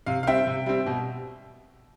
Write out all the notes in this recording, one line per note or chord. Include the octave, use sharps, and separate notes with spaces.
C3 F5
F5
G3 C4 E5 G5
C3
G3 C4
B2